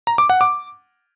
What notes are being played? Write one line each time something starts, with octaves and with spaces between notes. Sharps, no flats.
A#5
D6
F#5
D6